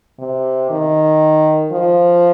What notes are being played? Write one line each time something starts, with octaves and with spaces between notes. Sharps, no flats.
C3
D#3
F3